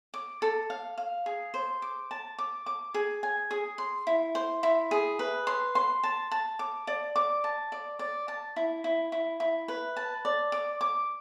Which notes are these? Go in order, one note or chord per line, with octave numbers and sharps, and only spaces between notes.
D6
A4
F5
F5
G#4
C5
D6
A5
D6
D6
G#4
G#5
G#4
C6
E4
C5
E4
G#4
B4
C6
C6
A5
A5
D6
D5
D6
A5
D5
D5
A5
E4
E4
E4
E4
B4
A5
D5
D6
D6